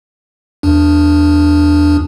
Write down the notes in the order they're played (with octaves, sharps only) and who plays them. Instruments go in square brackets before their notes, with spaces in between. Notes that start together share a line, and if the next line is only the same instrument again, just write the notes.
[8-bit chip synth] E2 D4